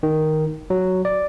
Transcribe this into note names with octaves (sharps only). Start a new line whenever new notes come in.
D#3
F#3
D5